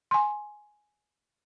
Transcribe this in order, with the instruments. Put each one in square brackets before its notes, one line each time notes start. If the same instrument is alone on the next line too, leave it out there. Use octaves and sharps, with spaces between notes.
[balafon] G#5 C6